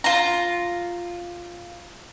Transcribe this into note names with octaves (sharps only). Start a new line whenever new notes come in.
F4 A#5